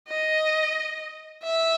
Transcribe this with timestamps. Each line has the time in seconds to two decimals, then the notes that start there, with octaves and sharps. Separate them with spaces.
0.09 D#5
1.44 E5